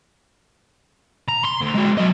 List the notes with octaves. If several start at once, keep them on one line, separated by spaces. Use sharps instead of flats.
A#5
C6
D2
G#3 F#4
F#3 D#5